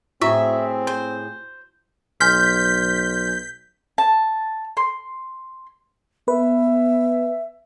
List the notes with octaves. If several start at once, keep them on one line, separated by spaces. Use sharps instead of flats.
A2 C4 E4 F#4 G#4 E5 C#6
C5
B1 G#5 C6 F6 G6 B6
A5
C6
B3 B4 E5